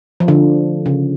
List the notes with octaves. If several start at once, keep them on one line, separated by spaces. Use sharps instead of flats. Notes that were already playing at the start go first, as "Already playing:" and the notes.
F3
D3
C#3